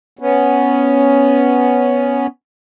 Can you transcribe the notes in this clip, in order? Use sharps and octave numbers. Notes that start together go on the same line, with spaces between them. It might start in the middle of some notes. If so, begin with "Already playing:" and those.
B3 C#4